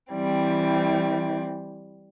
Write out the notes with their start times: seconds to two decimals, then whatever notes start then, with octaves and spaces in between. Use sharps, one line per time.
0.13 E3 G3 C4